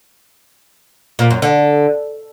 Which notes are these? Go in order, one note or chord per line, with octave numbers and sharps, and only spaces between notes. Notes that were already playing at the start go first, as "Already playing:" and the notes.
A#2
F#2
D3